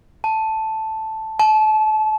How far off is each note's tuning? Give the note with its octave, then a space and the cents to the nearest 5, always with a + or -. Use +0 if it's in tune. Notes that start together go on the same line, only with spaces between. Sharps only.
A5 +0
A5 -30